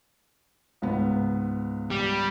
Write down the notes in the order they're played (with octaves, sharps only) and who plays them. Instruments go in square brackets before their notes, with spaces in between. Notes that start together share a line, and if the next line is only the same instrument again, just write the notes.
[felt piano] C#2 G#2 B3
[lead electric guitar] G3